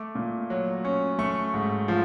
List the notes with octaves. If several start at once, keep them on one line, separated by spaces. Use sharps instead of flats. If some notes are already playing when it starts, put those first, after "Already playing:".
Already playing: A3 D6
A#2
F#3
C#4
A3 C#6
G#2
F3